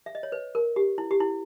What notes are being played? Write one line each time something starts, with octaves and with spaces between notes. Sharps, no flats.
E5
D#5
C#5
B4
A#4
G4
E4
G4
E4